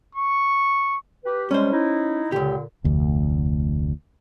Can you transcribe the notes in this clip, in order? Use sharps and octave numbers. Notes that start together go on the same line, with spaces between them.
C#6
G4 B4
C3 G3 G#3 C#4 C5
D#4 E4
C#2 A#2 D3 G4
F1 D2